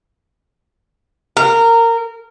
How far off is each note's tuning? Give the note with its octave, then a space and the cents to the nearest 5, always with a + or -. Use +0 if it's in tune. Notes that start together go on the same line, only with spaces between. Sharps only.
A#4 -20